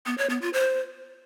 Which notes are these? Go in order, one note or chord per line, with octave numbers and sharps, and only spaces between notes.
B3
C#5
B3
F4
C5